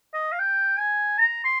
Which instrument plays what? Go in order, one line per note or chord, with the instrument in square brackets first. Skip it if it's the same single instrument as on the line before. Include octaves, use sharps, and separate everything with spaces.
[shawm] D#5
F5
G5
G#5
A#5
C6